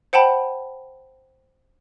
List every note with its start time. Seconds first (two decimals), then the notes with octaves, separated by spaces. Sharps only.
0.13 C5 F#5 G5 A5 B5